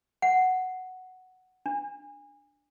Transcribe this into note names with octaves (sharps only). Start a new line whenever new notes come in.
F#5
D4